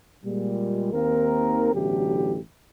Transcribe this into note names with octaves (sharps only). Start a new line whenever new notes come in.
A#2 G3 G#3
D#2 D#3 A#3 C4 A#4
A1 B2 D3 E3 F#3 G4